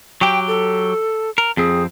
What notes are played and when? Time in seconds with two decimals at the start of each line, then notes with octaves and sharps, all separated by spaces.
0.21 F#3 G4 G5
0.48 A4
1.38 A#4
1.57 F2 C4 G#4